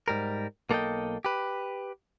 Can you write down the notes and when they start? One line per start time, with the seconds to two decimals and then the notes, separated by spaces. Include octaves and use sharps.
0.08 G#2 G3 A#4
0.70 B1 A#3 A4 D5 D#5 G5
1.25 G4 B4